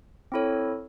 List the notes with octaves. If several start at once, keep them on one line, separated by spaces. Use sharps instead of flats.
C4 E4 A4 C#5